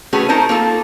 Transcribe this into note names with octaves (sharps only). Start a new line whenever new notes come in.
A3 C#4 F#4 G#4 B4
C#4 D#4 A#4 C5 A5
A#3 F4 A4